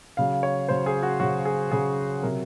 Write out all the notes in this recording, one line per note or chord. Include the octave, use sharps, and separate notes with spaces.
C#3 F#3 F5
C#5
C#3 F#3 C5
G#4
F#4
C#3 F#3 F#4
G#4
C#3 F#3 G#4
C3 F#3 A#4